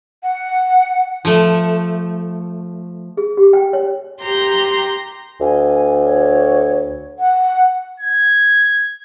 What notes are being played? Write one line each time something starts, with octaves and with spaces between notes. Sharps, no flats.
F#5
F3 A3
G#4
G4
G5
C#5
G4 A#5 C6 G6
D2 G#5
C#5
F#5
G#6